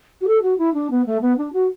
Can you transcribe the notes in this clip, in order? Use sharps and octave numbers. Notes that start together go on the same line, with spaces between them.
F#4
A4
F#4
E4
D4
B3
A3
B3
D4
F#4